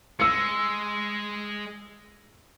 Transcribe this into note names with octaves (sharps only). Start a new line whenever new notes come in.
G#3 E6 C#7